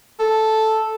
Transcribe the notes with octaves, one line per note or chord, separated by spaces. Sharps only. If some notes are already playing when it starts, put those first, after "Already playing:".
A4